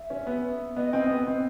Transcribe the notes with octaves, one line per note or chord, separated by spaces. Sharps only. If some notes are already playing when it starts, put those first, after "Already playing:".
Already playing: E5
C#4
B3
B3 D#5
C4
B3
C4